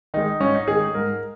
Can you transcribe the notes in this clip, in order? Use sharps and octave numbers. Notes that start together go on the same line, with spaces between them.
D#3 G#3 D#4
G#2 C#4
D#4
D#3 G#3 G#4
G#2 A#4